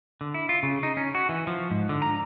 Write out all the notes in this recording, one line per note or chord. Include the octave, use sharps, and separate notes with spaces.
D3
E4
F4
C#3
D#4
C#4
F#4
E3
F3
G#2
D3
A#5